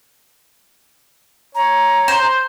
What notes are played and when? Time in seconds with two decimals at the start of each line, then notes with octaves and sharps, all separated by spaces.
1.55 C#5 A#5
2.08 C5